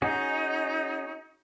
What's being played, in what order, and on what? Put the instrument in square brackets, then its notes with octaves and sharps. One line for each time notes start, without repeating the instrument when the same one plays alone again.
[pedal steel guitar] C#4 F#4 G#4 [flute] D#4